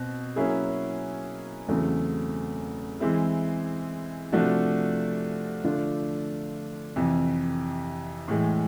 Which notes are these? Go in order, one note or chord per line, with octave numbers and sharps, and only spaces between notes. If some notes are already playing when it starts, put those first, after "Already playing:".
Already playing: B2 C4
F#3 A#3 C#4 E4 G#4
E2 C#3 F#3 A3 C4
E3 G#3 C4 E4
C3 F3 A3 D4 F#4
D3 F3 A3 D4 F4
F2 C3 E3
A2 E3 G#3